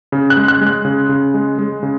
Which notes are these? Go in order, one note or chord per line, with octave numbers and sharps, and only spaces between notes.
C#3
F#6
G#3
F#6
G#3
F#6
C#3
C#3
G#3
G#3
C#3